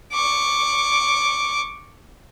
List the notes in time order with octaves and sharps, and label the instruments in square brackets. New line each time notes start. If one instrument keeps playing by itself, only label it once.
[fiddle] C#6 D6